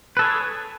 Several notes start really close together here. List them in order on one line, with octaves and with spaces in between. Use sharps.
B4 A4 C#5 G#4